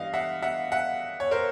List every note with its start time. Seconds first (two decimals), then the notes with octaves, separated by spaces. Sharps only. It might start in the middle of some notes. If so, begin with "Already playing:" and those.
Already playing: G2 E3 D#5 F5
0.14 E5 F#5
0.42 E5 F#5
0.72 E5 F#5
1.20 C#5
1.31 A#4 C5